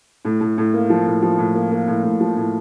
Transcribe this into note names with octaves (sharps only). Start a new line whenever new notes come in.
A2
A2
A2
A#3
F3
A2
F3
A2
A#3
A#3
A2
A2
F3
A2